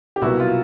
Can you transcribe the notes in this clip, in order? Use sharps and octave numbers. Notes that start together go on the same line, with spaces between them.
G4
C2 B2 F#3 A#3 E4 F#4
F4